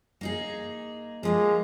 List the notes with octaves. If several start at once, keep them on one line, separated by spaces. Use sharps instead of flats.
A#3 D#4 G#4
F3 G#3 A#3 F4